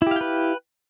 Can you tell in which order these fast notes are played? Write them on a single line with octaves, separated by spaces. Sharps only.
E4 G4 F5 G5 B4